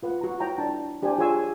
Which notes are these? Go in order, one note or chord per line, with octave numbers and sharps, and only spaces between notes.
F4 B4 F#5
F#4 A#5
E4 C#5 G5 A#5
D4 A5
D4 G4 C5 G#5
F4 G#4 C#5 G#5 C6 E6